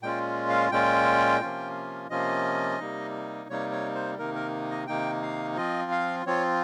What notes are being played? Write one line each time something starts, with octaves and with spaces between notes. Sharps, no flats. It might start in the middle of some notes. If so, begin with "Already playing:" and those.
A#2 G#3 C#4 F4 G5
F5
A#2 G#3 C#4 F4 G5
C3 F3 A#3 C#4 F4
C3 F3 A#3 C#4 F4 D#5
C3 G3 A#3 D#4
C3 G3 A#3 D#4 C#5
C#5
C5
C3 D#3 A#3 D#4 A#4
A#4
D#5
C3 D#3 A#3 D#4 G5
F5
F3 C4 F4 D#5
F5
F3 C4 F4 C#5